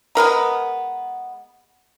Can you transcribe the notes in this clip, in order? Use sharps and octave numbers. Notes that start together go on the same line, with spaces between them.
G#3 B3 A#4 A#5